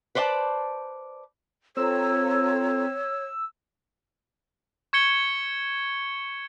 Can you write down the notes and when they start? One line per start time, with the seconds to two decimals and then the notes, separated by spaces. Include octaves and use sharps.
0.15 B4 C5 D5 F5 A5
1.77 C4 F4 A4 C#5 A#5 E6
4.93 C#6 G#6 C#7 G7